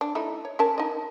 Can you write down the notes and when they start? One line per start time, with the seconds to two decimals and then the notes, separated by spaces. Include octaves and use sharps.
0.01 D4
0.15 A3 D#4 E4
0.45 C#5
0.59 C#4 A#4 A5
0.78 D#4 D#5